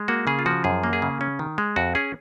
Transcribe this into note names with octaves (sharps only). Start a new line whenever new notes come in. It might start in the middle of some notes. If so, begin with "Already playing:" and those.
Already playing: G#3
A#3 F#4
C#3 G#4
F4
F3 F#4
F#2 G#4
A#3
G#4
C#3
C#4
D#3
G#3
F2 F#4
C#4 G#4